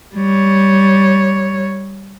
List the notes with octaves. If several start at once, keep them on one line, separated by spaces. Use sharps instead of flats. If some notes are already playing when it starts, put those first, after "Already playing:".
G3 C#5